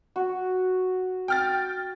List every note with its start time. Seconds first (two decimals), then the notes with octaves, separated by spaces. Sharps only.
0.16 F#4
1.28 G5 F6 A6